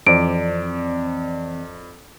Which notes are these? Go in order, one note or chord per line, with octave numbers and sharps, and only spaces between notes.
F2 E3 C4 D5 D7